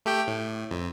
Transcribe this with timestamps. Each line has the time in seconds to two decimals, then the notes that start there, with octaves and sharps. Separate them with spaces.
0.06 A3 G4 G5
0.27 A2
0.71 F2